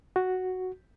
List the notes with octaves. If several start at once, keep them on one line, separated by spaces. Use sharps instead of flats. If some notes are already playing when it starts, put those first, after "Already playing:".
F#4